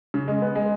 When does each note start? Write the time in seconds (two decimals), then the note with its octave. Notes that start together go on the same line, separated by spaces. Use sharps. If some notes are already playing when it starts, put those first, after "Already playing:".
0.14 C#3
0.28 G#3
0.42 B3
0.55 G#3